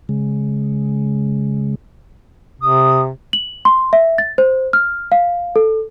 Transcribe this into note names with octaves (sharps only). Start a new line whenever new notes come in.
C#3 G#3
C3 D#6
F#7
C6
E5
A6
C5
F6
F5
A4